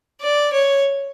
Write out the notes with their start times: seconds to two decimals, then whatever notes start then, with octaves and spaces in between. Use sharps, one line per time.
0.22 D5
0.53 C#5